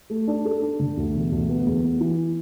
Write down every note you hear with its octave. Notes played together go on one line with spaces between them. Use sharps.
A3
D4
A4
D4
D3
D2
E1
D2
B3
E2
B3
E3